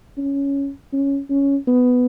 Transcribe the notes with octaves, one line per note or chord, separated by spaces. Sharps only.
C#4
C#4
C#4
B3